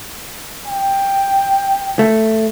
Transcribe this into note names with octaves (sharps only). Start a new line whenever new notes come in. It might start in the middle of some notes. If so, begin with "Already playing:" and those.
G5
A3